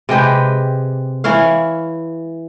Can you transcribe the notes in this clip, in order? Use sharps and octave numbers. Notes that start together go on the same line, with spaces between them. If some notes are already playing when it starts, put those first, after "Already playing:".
C3 G#3 G4 B4
E3 E4 C#5 F5